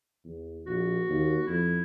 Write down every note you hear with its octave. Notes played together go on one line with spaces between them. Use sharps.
E2
A#1 F#4
D#2
F2 E4